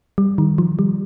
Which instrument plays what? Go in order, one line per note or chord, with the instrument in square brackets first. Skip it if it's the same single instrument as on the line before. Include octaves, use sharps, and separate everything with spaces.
[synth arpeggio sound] G3
D#3
F3
G3